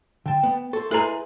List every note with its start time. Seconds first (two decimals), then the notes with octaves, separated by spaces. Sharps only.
0.26 D3 G5 A5
0.44 B3
0.73 A4 C5 E5 C#6
0.91 E4 G#4 A4 B4 D#5 A#5 C6